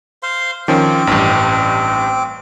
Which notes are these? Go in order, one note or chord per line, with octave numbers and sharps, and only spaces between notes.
C5 F5 C6
D#3 F3 C4 C#4 D6
A1 G2